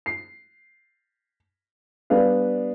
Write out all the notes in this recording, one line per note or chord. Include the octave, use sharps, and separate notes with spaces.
C7
G3 B3 D4 B4 F5